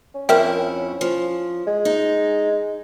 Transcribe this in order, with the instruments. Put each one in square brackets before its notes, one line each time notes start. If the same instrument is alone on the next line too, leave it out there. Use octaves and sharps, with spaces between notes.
[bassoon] C#4
[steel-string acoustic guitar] F2 E4 F#5 [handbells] A#4 E5 G5
[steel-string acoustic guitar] F3
[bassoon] G#3
[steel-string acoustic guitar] D#4